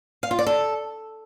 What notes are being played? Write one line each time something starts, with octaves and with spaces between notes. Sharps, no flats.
F5
F4
D5
A4